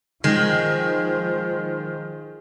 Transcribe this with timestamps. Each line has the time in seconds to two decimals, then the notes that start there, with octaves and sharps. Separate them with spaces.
0.24 D#3 F3 G#3